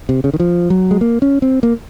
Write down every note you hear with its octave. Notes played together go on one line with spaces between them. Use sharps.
C3
C#3
D#3
F3
F#3
G#3
A#3
C#4
C4
A#3